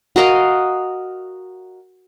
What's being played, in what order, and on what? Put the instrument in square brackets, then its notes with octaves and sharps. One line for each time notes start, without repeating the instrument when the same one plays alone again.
[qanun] F#4 A#4 D#5 F5